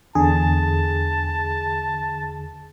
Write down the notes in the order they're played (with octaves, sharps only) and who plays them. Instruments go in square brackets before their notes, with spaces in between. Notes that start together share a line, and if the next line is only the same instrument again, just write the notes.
[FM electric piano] E2 D3 G#4 [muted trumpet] A5